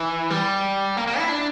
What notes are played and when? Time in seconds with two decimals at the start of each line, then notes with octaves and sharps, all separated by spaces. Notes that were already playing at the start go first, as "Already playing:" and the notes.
Already playing: E3
0.31 G3
0.97 A#3
1.07 A#3
1.18 E4
1.29 D4